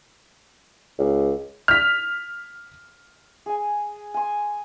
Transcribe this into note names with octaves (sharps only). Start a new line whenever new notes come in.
C#2
F6 B6
G#4 G#5
G#5 C6